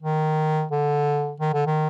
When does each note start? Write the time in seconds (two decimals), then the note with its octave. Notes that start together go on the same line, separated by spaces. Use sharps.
0.02 D#3
0.72 D3
1.40 D#3
1.53 D3
1.67 D#3